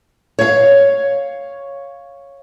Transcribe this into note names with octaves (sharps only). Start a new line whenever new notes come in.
C#5 F5